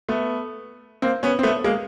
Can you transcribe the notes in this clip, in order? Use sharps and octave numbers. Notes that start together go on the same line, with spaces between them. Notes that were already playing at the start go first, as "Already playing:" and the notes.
A3 B3
A#3 C4
B3 C#4
C4
A3 B3
G#3 A#3